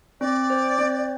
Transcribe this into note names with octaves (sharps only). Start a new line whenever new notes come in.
C4 D5
C5
C4